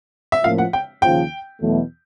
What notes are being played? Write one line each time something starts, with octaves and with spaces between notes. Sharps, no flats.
E5
A2 F3 A#3 C#4 F4 F5
F#5
G5
D#2 C#3 F3 G5
E2 B2 F#3 A3